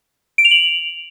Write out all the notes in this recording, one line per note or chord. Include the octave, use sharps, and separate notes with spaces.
D7
F7
F#7
F7